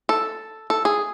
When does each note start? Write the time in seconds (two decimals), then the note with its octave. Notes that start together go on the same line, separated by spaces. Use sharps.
0.09 A4
0.70 A4
0.85 G#4